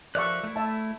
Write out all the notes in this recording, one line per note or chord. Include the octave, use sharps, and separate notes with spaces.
F3 A#4 D5 E5 C#6 F#6
A3 E4
E5 A5